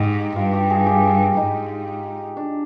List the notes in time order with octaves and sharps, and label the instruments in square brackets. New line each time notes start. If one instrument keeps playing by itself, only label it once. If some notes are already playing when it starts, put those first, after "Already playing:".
Already playing: [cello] G#2 [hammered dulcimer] D#4 G4
[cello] G2 [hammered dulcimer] F4
[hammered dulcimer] G4
G#4
G4
[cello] G#2 [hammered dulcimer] D#4
[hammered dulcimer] D4